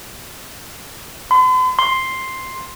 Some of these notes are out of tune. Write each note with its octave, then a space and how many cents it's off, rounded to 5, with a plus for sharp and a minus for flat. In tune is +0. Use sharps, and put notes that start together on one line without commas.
C6 -45
C6 +5